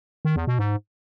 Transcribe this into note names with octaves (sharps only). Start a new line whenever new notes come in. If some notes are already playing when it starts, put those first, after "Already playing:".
D#3
E2
B2
G#2